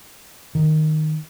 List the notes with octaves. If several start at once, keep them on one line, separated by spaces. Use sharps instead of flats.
D#3